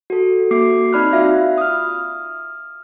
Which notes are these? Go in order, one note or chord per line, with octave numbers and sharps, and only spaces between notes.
F#4 A4
A#3 F#4 D6 C7
C4 D#4 D5 B5 F6 F#6
F4 F#4 E5 F5
D#6 F6